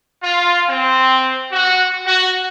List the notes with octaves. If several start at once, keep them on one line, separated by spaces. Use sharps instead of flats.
F4
C4
F#4
F#4